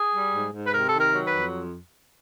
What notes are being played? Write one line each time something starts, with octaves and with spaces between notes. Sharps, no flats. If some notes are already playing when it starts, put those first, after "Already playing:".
Already playing: G#4
G3
G#2
G#2
B4
C3 A#4
D#3 A4
A#4
F#3
B4
F2